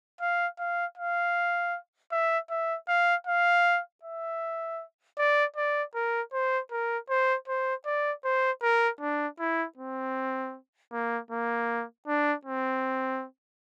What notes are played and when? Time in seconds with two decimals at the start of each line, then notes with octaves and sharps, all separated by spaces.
0.21 F5
0.59 F5
0.97 F5
2.12 E5
2.50 E5
2.88 F5
3.27 F5
4.03 E5
5.18 D5
5.56 D5
5.95 A#4
6.33 C5
6.71 A#4
7.09 C5
7.48 C5
7.86 D5
8.25 C5
8.62 A#4
9.01 D4
9.39 E4
9.77 C4
10.92 A#3
11.31 A#3
12.07 D4
12.45 C4